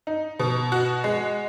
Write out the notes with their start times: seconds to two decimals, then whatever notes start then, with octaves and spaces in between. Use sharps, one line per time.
0.07 D#4
0.39 B2
0.72 F#4
1.04 G#3